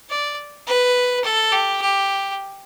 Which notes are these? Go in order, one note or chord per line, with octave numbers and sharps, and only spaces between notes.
D5
B4
A4
G4
G4